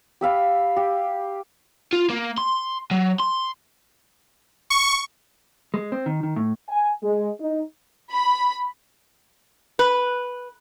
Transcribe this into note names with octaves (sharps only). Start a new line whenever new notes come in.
G4 E5 F5 B5
G4
F4
A#3
C6
F#3
C6
C#6
G#3
C4
D#3
D#3
A2
G#5
G#3
D#4
B5
B4